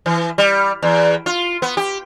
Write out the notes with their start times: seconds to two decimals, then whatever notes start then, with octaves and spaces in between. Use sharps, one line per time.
0.06 E3
0.38 G3
0.83 E2
1.26 F4
1.62 B3
1.77 G4